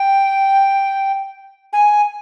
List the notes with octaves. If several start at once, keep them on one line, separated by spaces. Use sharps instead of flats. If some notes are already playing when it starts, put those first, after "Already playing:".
Already playing: G5
G#5